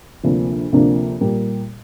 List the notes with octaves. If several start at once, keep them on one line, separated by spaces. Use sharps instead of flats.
D2 C3 F3 A#3 D4
D2 C3 F3 A#3 D4
A#2 G3 A#3